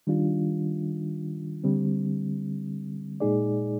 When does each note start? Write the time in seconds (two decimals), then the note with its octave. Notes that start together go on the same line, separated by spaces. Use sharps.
0.07 D#3 G3 D4 F4
1.64 D3 G3 C4
3.20 A#2 G#3 D#4 G#4 D5